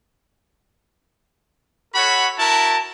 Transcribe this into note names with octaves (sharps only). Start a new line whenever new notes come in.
F#4 A4 C#5 F#5 B5
E4 F#4 A#4 A5